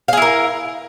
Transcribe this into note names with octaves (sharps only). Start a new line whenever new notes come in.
E4 G#4 A#4 F5